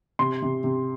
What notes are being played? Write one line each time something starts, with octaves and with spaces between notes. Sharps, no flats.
C3 C6
C3
C3